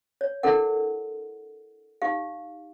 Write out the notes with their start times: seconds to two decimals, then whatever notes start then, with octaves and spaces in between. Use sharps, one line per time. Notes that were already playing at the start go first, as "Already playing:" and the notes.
0.21 C#5
0.43 D4 E4 A4 A#4 F#5
2.02 D#4 G4 F5